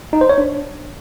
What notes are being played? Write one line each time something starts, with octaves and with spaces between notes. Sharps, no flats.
D#4
C5
C#5
D4